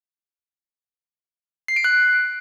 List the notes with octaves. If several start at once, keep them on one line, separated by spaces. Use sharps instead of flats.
C7
D7
F#6